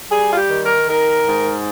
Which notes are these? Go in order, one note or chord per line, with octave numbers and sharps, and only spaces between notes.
G3 G#4
F4
G4
D#3
A#4
D#3 A#4
G#2